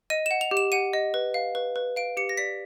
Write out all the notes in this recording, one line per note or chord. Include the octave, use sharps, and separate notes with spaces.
D#5 D#7
F#5 E7
F7
G4
E7
F#5 D#7
D#5
B4
F5
B4
B4
F5 D7
G4 C#7
A#6
D5 B6